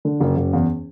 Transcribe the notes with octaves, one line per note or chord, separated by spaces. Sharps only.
D3
F#1
F#1
E2